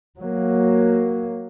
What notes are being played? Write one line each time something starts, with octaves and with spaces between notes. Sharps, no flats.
F#3 A#3